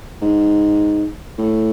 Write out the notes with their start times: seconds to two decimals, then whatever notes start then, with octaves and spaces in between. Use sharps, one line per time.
0.21 G#2
1.38 A2